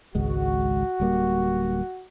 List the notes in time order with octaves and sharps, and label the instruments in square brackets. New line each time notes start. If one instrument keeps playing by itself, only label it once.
[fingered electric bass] G#1 C#2 G#3 [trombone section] F#4
[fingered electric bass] D1 G3 A#3